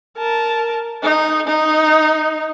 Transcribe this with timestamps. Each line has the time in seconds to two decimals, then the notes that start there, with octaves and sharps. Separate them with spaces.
0.18 A#4 A5
1.03 D#4
1.47 D#4